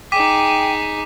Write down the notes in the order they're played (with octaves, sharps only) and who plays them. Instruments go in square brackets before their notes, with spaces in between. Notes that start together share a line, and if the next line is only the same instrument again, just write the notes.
[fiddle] D#4 G#4 [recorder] G5 [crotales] D6 B6 D#7